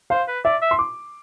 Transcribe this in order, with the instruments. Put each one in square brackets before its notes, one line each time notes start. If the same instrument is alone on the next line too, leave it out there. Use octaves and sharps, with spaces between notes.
[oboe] C5 [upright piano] F5
[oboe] B4
[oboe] D5 [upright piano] E5
[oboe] E5
[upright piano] C6
D6